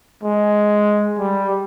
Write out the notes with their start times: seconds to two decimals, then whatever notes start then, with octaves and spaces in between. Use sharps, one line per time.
0.23 G#3
1.19 G3